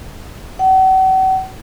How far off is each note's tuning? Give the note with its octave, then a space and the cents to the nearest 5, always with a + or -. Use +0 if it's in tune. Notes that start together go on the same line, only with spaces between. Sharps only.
F#5 +40